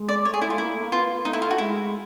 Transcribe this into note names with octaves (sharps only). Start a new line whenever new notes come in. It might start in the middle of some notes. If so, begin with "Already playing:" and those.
Already playing: G#3
D5
A3 C#5
G#4
A3
E4
A3 F4
A#3 E4
A3
A#3
B3 F4
A3 D#4
E4
F4
F#4
G#3 E4